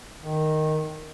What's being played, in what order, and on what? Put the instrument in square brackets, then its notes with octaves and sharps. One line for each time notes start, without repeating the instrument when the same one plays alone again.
[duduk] D#3